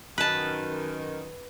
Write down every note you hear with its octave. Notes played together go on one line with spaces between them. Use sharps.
F#2 D#3 B4 A5